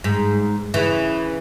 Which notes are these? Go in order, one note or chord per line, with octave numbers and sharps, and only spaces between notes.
G#2
C#3 E3